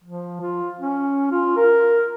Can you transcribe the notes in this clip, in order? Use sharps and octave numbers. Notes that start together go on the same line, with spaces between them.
F3
F4
C#4
F4
A#4